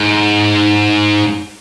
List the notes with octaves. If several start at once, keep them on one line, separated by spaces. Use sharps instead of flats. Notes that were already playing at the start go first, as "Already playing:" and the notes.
Already playing: G#2